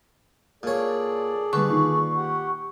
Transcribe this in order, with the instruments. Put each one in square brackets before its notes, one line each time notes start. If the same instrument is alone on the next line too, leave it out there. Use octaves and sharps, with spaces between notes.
[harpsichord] A#2 C#5 [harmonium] G#4 A4 D5
[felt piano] D3 G3 [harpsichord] B4 [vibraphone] C#6
[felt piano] A#2 D#3
[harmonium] G4 F#5